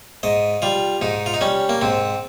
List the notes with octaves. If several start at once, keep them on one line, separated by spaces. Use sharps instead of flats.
G#2 D#5
G3 F4
G#2 D#4
F4
D#4
G3 C#4
A#3
G#2 C4